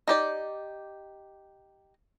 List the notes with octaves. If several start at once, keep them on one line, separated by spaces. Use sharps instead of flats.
D#4 G4 D5